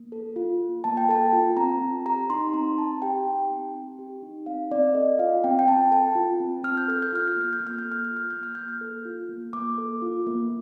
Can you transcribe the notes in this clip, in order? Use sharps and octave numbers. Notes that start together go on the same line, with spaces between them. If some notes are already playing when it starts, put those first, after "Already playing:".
Already playing: A#3
A4
F4
A#3
A#3 A5
G5
A4 A5
F4
C4 A#5
C4
G4 A#5
D#4 C6
C4 A#5
C4 A5
G4 G5
D#4
C4
C4
G4
D#4
C4 F5
C4 D5
A4 D#5
F4 F5
C4 G5
G5
C4 A5
A4 A5
F4
C4
C4 F6
G6
A4 F6
G6
F4 F6
G6
A#3
F6
G6
A#3
F6
G6
A4
F6
F4 G6
F6
A#3 G6
F6
A#3 G6
F6
A4
F4
A#3
A#3 D6
A4
F4
A#3